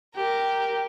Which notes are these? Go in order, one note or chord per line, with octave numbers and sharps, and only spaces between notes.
G4 A#4